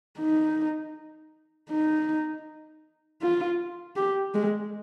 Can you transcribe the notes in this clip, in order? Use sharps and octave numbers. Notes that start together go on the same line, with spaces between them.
D#4
D#4
F4
G4
G#3